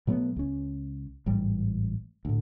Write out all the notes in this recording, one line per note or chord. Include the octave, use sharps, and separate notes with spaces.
B2 F#3 A3 B3
C#2 C#4
A1 G#2 G3
D2 A2